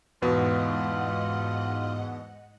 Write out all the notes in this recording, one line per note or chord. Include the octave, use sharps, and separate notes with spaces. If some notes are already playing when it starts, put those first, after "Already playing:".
E2 G#2 B2 B3 F4 D#5 F#5